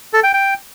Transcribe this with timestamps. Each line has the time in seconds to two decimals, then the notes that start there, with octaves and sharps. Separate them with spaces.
0.14 A4
0.24 G5
0.34 G5